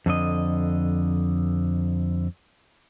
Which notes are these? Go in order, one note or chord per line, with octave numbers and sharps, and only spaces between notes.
F2 D3 D#5